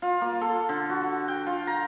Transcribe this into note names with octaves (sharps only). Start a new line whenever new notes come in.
F4
A#3
A4
D3
F#4
G5
F4
A#5